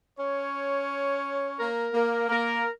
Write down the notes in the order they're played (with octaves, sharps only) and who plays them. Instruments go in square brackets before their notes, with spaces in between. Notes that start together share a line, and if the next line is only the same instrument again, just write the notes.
[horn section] C#4 C#5
A#3 A#4
A#3 A#4
A#3 A#4